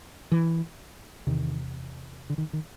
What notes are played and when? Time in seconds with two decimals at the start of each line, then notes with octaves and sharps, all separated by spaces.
0.32 E3
1.27 E2 C3 D#3
2.30 D3
2.38 D#3
2.53 D#3